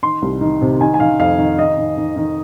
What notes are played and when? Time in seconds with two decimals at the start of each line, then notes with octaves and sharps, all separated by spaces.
0.03 D#3 C6
0.22 C2
0.41 D#3
0.62 C3
0.80 D#3 G#5
0.94 G#5
1.00 D#3 F5
1.19 F2 F5
1.38 D#3
1.59 D#3 D#5
1.78 D#3
1.97 D#3
2.16 D#3